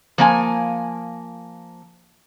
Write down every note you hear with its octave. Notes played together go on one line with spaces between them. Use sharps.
F3 A#3 G#5